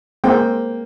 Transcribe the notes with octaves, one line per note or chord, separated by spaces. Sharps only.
G#3 A#3 C4 G5